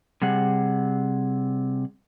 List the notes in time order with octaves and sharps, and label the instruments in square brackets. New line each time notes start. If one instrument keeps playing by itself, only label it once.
[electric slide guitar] C3 G3 G#4 F#5